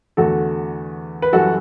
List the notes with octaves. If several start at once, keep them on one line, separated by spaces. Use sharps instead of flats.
E2 D3 A3 F#4 A4
B4
F#2 E3 G3 F#4 A4